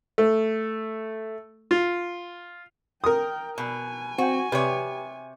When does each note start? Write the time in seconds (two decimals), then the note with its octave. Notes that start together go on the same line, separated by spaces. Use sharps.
0.18 A3
1.71 F4
3.04 A#4 G5 D#6
3.58 B2 G#5
4.18 C4 F#4 G5
4.52 C3 G4 B4 C#5